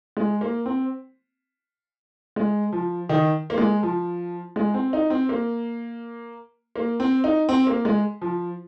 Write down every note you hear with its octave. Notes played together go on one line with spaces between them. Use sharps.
G#3
A#3
C4
G#3
F3
D#3
A#3
G#3
F3
G#3
C4
D#4
C4
A#3
A#3
C4
D#4
C4
A#3
G#3
F3